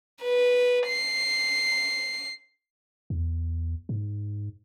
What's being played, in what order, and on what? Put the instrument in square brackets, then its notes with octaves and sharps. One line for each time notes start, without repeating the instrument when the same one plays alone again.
[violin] B4
C7
[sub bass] E2
G#2